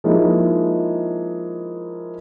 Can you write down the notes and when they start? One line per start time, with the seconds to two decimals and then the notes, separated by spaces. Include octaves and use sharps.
0.04 F3 G#3 A#3 D#4 E4